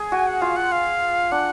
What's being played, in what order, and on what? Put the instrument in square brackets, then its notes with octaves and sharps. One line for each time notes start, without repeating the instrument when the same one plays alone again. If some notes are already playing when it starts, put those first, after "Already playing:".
Already playing: [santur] G#4
[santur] F#4 [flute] G#5
[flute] F#5
[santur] F4 [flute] F5
[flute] F#5
F5
[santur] D4 [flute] F#5